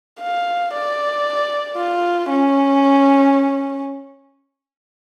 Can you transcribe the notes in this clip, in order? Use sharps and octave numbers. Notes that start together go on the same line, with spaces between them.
F5
D5
F4
C#4